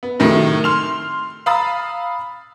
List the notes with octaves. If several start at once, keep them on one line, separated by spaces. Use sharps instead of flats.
B3
A2 C3 D#3 F#3
C6 F6 F7
F5 A#5 B5 D#6 E6 A6